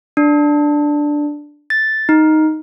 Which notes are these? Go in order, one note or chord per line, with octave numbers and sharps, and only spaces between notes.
D4
A6
D#4